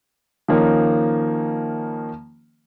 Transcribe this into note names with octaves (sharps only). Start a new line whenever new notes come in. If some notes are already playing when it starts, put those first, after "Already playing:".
D#3 F3 A#3 C#4 D#4